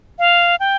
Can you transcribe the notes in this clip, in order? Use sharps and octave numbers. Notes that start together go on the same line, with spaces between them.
F5
G5